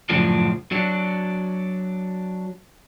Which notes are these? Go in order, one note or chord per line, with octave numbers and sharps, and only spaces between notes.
F#2 A2 C#3 F3 D4
F#3 D4